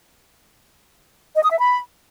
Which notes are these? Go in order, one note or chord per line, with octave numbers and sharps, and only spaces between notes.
D#5
D#6
E5
B5